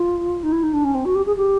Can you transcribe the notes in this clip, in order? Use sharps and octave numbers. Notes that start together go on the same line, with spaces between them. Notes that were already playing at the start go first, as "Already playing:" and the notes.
Already playing: F4
D#4
E4
D#4
D4
C#4
C4
F#4
G4
G#4
G4